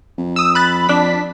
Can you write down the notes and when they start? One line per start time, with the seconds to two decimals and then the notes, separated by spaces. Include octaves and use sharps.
0.18 F2
0.36 D#6 E6
0.55 B5 F#6 A6
0.89 F2 D4 B6